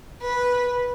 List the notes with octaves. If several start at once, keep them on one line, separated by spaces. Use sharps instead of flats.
B4